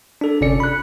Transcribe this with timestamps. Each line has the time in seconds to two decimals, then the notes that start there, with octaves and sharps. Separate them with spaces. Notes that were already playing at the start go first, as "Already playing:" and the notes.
0.21 D4 A4
0.41 G1 C3 C#4 D5 C#7
0.60 B5 F#6